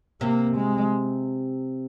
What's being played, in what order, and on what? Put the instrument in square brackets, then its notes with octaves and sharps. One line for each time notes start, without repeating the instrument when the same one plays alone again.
[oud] C3 [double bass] A#3
[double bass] G#3